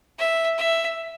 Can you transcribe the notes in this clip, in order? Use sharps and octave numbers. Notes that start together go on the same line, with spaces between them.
E5
E5